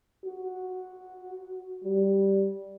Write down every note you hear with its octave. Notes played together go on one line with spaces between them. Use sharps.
F#4
G3